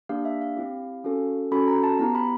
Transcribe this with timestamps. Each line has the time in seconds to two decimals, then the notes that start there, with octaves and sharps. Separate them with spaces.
0.09 A#3 D4 G4 F5
0.25 E5
0.41 F5
0.57 C4 E4 G4
1.04 C#4 F#4 A4
1.52 C#4 F#4 A4 B5
1.68 A#5
1.83 A5
1.99 B3 E4 G4 A#5
2.15 B5